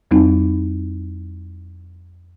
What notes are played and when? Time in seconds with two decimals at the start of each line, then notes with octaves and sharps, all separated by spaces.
0.11 F2 G3 C4 D#4